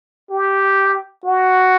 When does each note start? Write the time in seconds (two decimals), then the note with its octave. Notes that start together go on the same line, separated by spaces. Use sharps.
0.31 G4
1.25 F#4